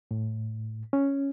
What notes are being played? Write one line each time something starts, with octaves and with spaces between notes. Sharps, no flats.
A2
C#4